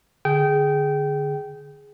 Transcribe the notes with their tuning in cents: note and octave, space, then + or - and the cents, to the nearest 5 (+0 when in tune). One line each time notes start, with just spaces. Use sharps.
D3 +0 G#4 +0 G5 -20